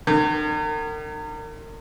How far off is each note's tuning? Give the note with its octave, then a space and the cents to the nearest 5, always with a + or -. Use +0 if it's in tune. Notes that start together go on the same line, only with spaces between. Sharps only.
D#3 -40